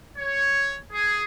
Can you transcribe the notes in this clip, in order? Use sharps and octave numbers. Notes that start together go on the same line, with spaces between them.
C#5
G#4